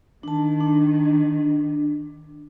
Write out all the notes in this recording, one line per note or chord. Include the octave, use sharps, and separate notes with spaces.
D#3 D4 A5
D4